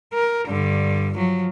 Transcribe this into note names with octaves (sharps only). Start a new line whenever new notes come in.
A#4
G2 D3
F3 F#3